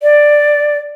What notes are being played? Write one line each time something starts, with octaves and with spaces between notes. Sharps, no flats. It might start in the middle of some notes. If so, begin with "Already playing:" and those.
D5